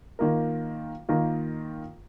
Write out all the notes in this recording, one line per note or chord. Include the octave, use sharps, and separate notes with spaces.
D#3 A#3 F4 A#4
D#3 A#3 F4 A#4